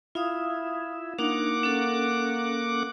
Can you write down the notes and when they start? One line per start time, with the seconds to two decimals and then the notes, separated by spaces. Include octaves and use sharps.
0.15 E4 F4 F5 D#6
1.19 A#3 D4 D#4 F#5 D6
1.63 C#4 A4